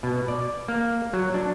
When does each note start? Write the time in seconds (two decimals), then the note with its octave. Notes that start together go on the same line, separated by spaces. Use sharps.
0.03 B2
0.28 D5
0.68 A#3
1.13 F#3
1.34 D4